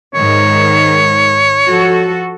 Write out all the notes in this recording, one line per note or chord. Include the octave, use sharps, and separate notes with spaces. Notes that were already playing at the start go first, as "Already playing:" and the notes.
G#2 D#3 C#5
F3 F#4 A4